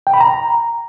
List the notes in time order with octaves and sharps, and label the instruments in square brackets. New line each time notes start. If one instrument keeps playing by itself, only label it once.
[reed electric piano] G5
B5
A#5